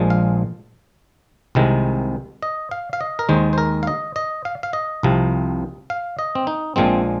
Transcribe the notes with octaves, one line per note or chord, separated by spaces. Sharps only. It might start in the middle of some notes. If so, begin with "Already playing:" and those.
Already playing: A#1 A#2 F3 G#3
F5
C2 C3 D#3 G#3
D#5
F5
F5
D#5
A#4
D#2 D#3 G#3 C5
C5
A#4
F5
D#5
D#5
F5
F5
D#5
C2 C3 F3
F5
D#5
C4
D#4
A#1 A#2 F3 G#3 C4